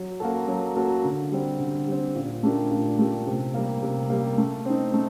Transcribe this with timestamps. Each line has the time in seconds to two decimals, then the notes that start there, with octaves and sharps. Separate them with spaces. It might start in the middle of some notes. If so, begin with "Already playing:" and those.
Already playing: F#3
0.20 A#3 F#4 A4
0.48 F#3
0.76 A#3 F#4 A4
1.04 D3
1.32 G3 C4
1.60 D3
1.87 G3 C4
2.15 A#2
2.43 A3 D4 G4 A#4
2.71 A#2
2.99 A3 D4 G4 A#4
3.27 C3
3.54 G3 A#3
3.83 C3
4.09 G3 A#3
4.38 A3
4.65 C4 D#4
4.93 A3